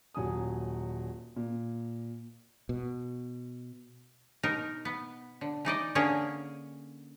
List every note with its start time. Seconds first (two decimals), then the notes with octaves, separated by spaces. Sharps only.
0.14 D#1 F#3 G#5 D#6
1.36 A#2
2.69 B2
4.43 B2 D#4 A#4
4.85 B3
5.41 D3
5.65 E3 D#4 D5 D#5
5.95 D3 A#3 C#4 G#4 A#4 C#5